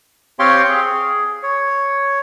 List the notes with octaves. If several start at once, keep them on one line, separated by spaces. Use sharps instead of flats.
C4 G4 C#5 F5 G5 C6
G#4
C#5